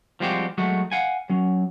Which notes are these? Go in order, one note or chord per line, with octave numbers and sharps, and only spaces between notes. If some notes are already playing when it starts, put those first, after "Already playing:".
F3 G3 G#3 C4 F#4 G4
F#3 G#3 A3 F#4
F5 F#5 G#5
F#3 C#4